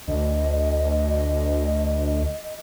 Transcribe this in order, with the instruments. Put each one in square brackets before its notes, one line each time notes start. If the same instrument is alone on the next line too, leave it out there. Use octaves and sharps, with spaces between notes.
[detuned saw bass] D2 [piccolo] D#5